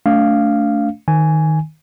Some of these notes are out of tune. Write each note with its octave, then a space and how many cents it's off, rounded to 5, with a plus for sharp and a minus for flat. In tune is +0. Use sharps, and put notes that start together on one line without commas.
A3 +0 D4 -35 F5 -5
D#3 +0 G#5 +0